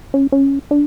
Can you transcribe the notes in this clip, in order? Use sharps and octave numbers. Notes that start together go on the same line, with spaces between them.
C#4
C#4
D4